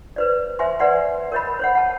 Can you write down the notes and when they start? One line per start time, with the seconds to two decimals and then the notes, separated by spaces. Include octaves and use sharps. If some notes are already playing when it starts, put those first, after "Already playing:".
0.16 B4 C5 D5
0.59 C5 E5 G#5 C6
0.80 B4 D5 F#5 C6
1.32 A#4 C#5 D#5 B5
1.60 C5 C#5 F#5
1.75 F#5 A5